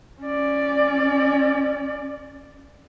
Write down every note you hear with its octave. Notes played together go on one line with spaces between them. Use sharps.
C#4 D5